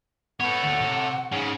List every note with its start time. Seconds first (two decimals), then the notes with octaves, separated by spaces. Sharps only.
0.40 B3 A4 B4 C#5 F#5
0.63 D2
0.81 C3
1.32 G#2 C#3 C#4